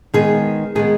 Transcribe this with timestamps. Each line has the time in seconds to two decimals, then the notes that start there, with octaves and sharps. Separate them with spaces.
0.14 D#3 G#3 B3 G#4
0.75 D#3 G#3 B3 G#4